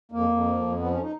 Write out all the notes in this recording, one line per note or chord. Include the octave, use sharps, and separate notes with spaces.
F2 A#3
F2
F3
F2
F3 B3
C#4
D#4